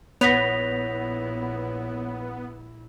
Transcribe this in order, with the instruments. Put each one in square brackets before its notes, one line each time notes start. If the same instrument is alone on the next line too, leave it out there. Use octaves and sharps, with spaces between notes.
[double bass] A#1 E4 [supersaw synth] B3 [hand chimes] C#5 [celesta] A#6 B6 F7